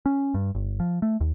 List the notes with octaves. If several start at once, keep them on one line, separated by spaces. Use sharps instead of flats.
C#4
G2
G1
F3
A3
D#2